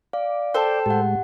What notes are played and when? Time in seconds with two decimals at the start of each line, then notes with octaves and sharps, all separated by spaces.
0.13 D5 F5
0.54 A4 C5 G5 A5
0.86 A2 G#3 G4 F#5